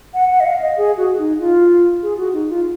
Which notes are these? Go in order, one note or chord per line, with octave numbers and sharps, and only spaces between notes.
F#5
F#5
D#5
F5
D#5
G#4
F#4
D#4
F4
G#4
F#4
D#4
F4